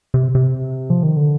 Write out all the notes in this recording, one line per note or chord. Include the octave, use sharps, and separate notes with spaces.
C3
C3
F3
D#3
D3